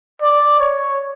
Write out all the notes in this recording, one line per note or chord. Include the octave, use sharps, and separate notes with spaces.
D5
C#5